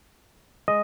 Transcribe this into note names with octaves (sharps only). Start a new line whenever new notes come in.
G#3 D#5